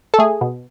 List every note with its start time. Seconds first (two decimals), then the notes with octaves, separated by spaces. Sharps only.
0.14 A4
0.19 A3 G#4
0.41 B2